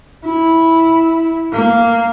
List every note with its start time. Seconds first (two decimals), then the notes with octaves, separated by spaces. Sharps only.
0.24 E4
1.53 A#3